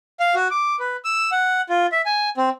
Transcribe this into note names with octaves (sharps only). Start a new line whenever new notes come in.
F5
F#4
D6
B4
E6
F#5
F4
E5
G#5
C4